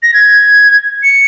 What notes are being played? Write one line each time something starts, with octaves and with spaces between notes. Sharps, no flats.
A#6
G#6
C#7